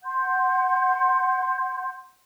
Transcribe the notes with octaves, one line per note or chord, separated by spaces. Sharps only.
F#5 C6 G6